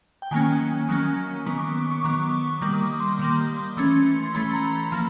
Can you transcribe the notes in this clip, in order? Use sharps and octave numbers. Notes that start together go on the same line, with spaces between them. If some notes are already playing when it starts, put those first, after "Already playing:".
G5
D#3 F#3 A#3 C#4 G#5
D#3 F#3 A#3 C#4
D#3 F#3 B3 C#6
D6
C#6
D6
C#6
D#3 F#3 B3 D6
C#6
D#3 G3 A#3 D6
D#6
D6
C6
D#3 G3 A#3
E3 A3 C#4
C6
E3 A3 C#4 B5
A#5
B5
F3 A#3 A#5